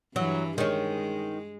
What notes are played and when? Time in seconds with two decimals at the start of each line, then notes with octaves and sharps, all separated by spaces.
0.16 G2 E3 F#3
0.58 D#3 G#3 C#4